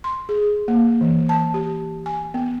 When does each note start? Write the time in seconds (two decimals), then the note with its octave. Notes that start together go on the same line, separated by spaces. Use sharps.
0.04 C6
0.29 G#4
0.68 A#3
1.01 E3
1.29 A5
1.54 G4
2.06 G#5
2.34 B3